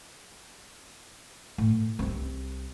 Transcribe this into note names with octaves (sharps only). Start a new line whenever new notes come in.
A2
C2 C4